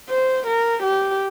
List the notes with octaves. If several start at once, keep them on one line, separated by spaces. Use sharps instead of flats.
C5
A#4
G4